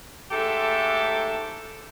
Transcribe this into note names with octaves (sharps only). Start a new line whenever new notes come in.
G#2 A3 G4 A4 E5 A5